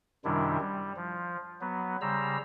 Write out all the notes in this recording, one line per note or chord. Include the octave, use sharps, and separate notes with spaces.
F#2 C3 D#3 G3 D4 E4
G3
F3
F#3 B3
C#3 G3 C5 A#5 E6